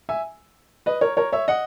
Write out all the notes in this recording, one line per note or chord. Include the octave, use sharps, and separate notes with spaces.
E5 G#5
B4 D#5
A#4 C#5
A#4 C#5
C#5 E5
D#5 F#5